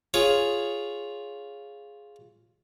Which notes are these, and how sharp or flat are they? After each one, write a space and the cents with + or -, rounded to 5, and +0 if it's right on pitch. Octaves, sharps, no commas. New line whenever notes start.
F4 +0 G#4 +0 C#5 +0